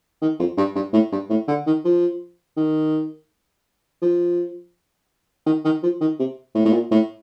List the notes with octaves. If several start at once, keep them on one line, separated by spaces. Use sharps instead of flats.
D#3
F2
G2
G2
A2
G2
A2
D3
D#3
F3
D#3
F3
D#3
D#3
F3
D#3
C3
A2
A2
A#2
A2